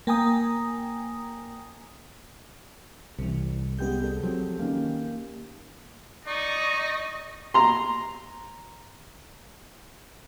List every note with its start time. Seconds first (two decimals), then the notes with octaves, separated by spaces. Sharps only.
0.07 A#3 G5 G#5 A#5 D#6
3.19 C2 C3 E3
3.79 G#3 B3 G4 G5 G6
4.02 G#4 A4
4.23 F3 F#3 C4
4.59 D#3 A#3 C#4
6.27 D#4 D5 D#5 C#6
7.54 A#5 C6